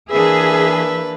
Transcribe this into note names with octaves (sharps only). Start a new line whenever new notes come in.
E3 A#3 D4 G#4 B4 E5